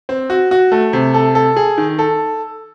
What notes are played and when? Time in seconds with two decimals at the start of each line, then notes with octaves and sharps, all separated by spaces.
0.09 C4
0.30 F#4
0.51 F#4
0.72 A3
0.93 C3
1.14 A4
1.35 A4
1.56 G#4
1.78 D#3
1.99 A4